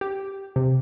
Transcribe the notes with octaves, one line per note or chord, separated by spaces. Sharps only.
G4
C3